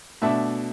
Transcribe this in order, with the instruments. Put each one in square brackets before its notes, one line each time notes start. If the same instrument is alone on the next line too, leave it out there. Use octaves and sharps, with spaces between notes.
[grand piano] B2 A3 D4 E5 A5